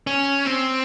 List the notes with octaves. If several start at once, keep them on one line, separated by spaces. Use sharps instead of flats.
C#4
C4